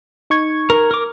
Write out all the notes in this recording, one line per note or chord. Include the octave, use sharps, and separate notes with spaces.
D#4 C#6 G#6
A#4
A#4 D6